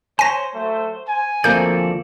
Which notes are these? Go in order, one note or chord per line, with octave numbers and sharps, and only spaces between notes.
C5 C#5 G#5 A#6
F#3 A3
G#5
D2 F3 A#3 C4 A4 D5 G6